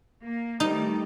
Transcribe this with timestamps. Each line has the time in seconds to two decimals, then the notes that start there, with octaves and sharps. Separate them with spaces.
0.23 A#3
0.60 D#3 G3 A3 D#4